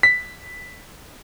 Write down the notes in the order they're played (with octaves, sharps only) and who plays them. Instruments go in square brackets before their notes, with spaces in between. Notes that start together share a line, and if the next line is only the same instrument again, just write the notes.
[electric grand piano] B6